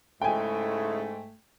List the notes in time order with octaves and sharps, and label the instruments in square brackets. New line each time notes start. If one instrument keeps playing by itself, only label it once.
[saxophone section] G#2 A3 [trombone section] C#3 G#3 E4 [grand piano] G5 G#5